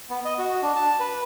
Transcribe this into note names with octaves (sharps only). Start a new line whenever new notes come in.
B3
D#5
F#4
D4
A5
B4